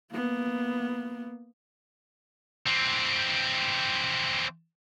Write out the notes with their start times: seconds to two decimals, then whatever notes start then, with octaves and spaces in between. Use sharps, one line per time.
0.11 A#3 B3
2.66 E3 C4